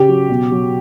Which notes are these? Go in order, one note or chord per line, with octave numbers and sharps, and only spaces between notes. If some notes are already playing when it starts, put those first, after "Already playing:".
Already playing: C#3 G4
F#3
B2
F#3